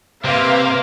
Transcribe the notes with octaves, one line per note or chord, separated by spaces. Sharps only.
C3 A#3 G4 B4 E5 F5 C6